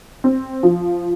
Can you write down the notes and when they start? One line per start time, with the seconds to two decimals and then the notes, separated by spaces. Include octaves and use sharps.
0.24 C4
0.63 F3